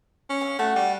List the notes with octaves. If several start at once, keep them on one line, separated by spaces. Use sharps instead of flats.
C#4
G#4 E5 F5
A3 F#4 F#5
G3